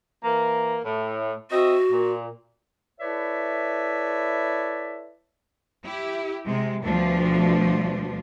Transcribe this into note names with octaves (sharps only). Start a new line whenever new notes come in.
E3 A#3
A2
C4 F#4 D#5 E5
A#2
E4 A4 B4 C#5 D5 E5
E4 G4
C3 G#3
D2 B2 F3 G3 D4